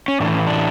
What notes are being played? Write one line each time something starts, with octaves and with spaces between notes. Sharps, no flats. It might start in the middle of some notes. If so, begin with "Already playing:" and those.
C#4
A2 E3 A3 D4
C#4
D4